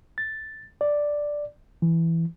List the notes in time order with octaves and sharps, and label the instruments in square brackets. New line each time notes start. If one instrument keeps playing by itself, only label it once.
[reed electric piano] A6
D5
E3